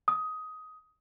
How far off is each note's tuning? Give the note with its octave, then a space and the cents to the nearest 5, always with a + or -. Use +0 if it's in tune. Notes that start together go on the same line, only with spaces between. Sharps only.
D#6 +15